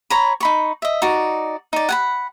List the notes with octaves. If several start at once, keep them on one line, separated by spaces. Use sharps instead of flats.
C#5 A#5 B5
D#4 B5 C#6
D#5 E5
D#4 F#4 D5
D#4 D5
F#5 G#5 B5